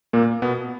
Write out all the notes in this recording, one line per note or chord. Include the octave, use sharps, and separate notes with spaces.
A#2 A#3
B2 B3